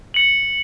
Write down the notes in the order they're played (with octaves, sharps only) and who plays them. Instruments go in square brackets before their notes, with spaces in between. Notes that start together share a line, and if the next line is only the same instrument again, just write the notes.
[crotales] C#7 F#7